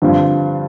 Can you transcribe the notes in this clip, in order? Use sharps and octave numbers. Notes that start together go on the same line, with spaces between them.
G2 D3 F3 C4 F4